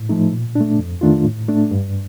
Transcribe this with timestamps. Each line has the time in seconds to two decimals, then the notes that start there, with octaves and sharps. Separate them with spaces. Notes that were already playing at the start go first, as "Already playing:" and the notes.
Already playing: A2
0.09 F3 A3 D#4
0.33 A#2
0.55 A3 D4
0.79 F2
1.01 D#3 A3 D4 F4
1.24 A2
1.48 A3 D4
1.71 G2